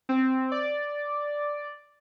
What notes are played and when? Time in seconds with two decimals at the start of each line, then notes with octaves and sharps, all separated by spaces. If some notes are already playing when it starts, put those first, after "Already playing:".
0.09 C4
0.52 D5